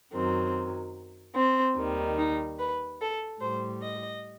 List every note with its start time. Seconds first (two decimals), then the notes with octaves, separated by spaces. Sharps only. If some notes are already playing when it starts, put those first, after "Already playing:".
0.14 F#2 D#3 F#3 C4
1.36 C4
1.77 D#2 D#3 G3
2.18 D#4
2.59 B4
3.00 A4
3.41 A2 G3 C5
3.82 D#5